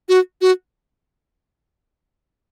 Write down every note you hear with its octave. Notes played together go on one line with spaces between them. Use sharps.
F#4
F#4